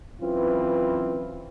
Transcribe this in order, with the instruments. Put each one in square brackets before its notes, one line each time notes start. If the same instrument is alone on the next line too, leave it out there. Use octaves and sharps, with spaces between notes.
[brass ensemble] F#2 E3 C4 F4 B4